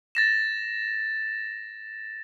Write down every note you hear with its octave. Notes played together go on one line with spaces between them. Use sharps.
A6 A#6 E7